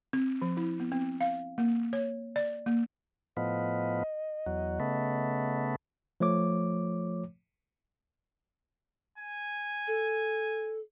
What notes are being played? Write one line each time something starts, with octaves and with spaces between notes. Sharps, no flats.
C4
F3
E4
B3
C4
F5
A#3
C#5
D5
A#3
A2 F3 B3 D#5
E2 F#3
C#3 A3 B3
F3 A3 C#5 D6
G#5
A4